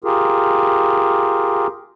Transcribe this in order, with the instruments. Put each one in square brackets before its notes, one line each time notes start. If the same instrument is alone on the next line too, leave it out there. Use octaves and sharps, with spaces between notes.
[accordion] F4 G4 G#4 A#4